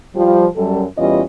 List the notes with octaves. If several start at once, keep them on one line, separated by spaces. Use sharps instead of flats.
F3 G3
F#2 G3 A4
E2 G3 C#4 F4 B4 D#5